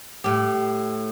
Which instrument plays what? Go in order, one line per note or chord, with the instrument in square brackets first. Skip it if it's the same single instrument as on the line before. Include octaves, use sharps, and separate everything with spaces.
[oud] A2 G4